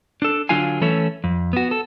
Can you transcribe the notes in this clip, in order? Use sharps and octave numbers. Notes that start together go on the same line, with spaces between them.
D4 A4
D3 F#3 D4 F4 F5 G#5
E3 A3 C#4 A4 C#5
F2
B3 F#4
A4